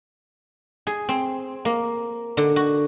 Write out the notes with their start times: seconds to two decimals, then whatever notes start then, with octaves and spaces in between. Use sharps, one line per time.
0.87 G#4
1.09 C4
1.65 A#3
2.37 D3
2.56 F#4